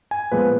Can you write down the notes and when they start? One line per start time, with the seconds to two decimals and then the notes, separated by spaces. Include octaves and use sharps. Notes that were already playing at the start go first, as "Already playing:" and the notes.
0.11 G#5
0.32 A#2 F3 G#3 B3 B4